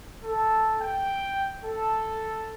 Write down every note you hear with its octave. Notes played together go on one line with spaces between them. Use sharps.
A4
G5
A4